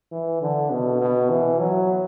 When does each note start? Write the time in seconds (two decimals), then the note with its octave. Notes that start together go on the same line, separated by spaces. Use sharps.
0.12 E3
0.41 D3
0.71 B2
1.00 B2
1.30 E3
1.59 F#3